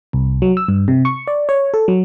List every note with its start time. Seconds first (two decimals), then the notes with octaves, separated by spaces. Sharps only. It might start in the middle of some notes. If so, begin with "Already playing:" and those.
0.13 C2
0.42 F#3
0.57 E6
0.68 G2
0.88 C3
1.05 C#6
1.27 D5
1.49 C#5
1.74 A4
1.88 F#3